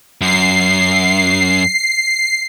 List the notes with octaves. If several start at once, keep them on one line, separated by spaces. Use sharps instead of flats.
F#2 C7